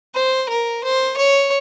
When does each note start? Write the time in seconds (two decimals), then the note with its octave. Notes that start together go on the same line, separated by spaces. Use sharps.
0.15 C5
0.50 A#4
0.84 C5
1.17 C#5